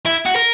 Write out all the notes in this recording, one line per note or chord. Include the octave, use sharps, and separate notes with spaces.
E4
F#4
A#4